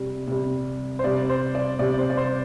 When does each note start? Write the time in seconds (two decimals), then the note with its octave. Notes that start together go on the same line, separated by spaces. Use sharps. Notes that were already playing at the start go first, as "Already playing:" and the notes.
Already playing: C3 G3
0.27 C3 G3
0.99 C5
1.04 C3 G3 D5
1.30 C5
1.55 D5
1.79 C3 G3 D5
1.99 C5
2.10 D5
2.17 C5